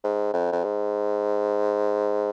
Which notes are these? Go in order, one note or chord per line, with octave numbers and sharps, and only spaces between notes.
G#2
F2
F2
G#2